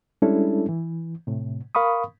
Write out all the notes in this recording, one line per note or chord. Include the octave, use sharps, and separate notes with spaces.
G3 G#3 C#4 D4 E4 A4
E3
A2 C3
A#4 F5 B5 C#6 D#6